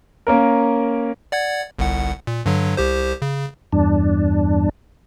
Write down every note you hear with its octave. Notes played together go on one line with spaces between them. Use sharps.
A#3 C#4 A#4
D5 F#5 G#6
G1 C2 F#5
A#2
G2 D3 F#3
C2 G4 C5
C#3
E2 G2 D4